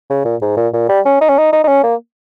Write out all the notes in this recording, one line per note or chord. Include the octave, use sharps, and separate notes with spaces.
C#3
A#2
G#2
A#2
A#2
G3
C#4
D#4
C#4
D#4
D#4
D#4
C#4
A#3